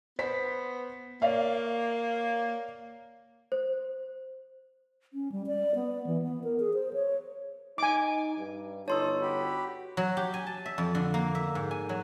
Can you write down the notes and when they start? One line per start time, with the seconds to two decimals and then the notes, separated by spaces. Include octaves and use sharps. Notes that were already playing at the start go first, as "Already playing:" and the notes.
0.19 B3 C5 B6
1.22 A#3 C#5 D5 F5
3.52 C5
5.14 C#4
5.32 G3
5.47 D5
5.75 B3
6.06 E3
6.22 B3
6.44 A#4
6.59 G#4
6.74 C5
6.93 C#5
7.78 D#4 G#5 D6
8.38 G2
8.88 G1 D#4 C#5 A5 C6 E6
9.22 F#4 G4 B5
9.97 F#3
10.17 G4
10.34 G#5
10.47 A5
10.66 E5
10.78 F2
10.95 D3
11.14 A#3
11.35 E5
11.55 G#2
11.71 G#5
11.89 F#3